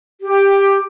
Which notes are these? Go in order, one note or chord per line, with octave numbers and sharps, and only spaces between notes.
G4